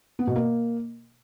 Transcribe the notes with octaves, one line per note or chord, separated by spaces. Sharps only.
B3
B2
A#3